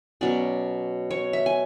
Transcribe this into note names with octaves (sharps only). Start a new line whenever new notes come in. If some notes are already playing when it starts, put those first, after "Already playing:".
B2 F#3 C#4 D5
C#5
E5
G#5